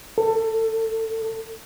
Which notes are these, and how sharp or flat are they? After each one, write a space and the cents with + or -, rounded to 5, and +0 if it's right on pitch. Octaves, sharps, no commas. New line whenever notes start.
A4 +25